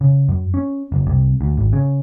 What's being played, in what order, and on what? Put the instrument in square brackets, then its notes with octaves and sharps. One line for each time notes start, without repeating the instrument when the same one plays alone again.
[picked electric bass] C#3
F#2
C#4
F#1
C2
D2
G#1
C#3